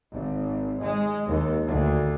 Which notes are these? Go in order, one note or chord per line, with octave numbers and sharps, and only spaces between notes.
G#1
G#3
D#2
D2